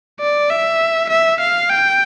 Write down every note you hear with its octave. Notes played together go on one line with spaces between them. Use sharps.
D5
E5
E5
F5
G5